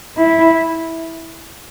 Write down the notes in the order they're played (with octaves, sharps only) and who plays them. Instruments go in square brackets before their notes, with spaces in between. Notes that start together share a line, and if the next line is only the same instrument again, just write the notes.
[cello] E4